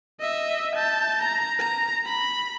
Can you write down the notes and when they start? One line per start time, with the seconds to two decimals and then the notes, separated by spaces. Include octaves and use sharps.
0.20 D#5 E5
0.76 A5 G6
1.22 A#5
1.59 A#5
2.06 B5